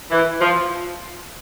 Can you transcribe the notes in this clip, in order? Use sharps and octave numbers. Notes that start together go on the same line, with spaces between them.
E3
F3